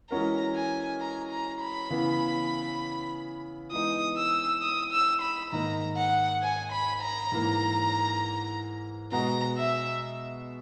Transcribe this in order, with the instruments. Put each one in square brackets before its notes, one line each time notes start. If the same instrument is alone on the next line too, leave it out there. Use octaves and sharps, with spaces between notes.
[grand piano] E3 G#3 C#4 F#4 A#4 [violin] A#5
[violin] G#5
A#5
A#5
B5
[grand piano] C#3 E3 B3
[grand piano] E3 G#3 B3 D#4 [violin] D#6
[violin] E6
D#6
E6
B5
[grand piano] G#2 D#3 A#3 D#4 [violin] A#5
[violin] F#5
G#5
B5
A#5
[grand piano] G#2 E3 A#3
[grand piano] B2 G#3 B3 F#4 [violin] A#5
[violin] E5